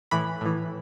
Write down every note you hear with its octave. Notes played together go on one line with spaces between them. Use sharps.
A2 E3 B5
A2 E3